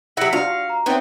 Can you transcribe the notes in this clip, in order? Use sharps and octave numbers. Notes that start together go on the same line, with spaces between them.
F#3 E4 G4 F#5 A#6 C#7
D4 F4 F#4 F5
A#5
B3 C4 D#4 C#5 E5